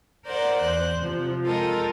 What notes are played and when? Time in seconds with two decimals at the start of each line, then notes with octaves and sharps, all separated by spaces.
0.24 A#4 C5 D5 F#5
0.61 E2 C5 F#6
0.99 C3 F3
1.44 G#3 F4 A4 A#4 D#5 G5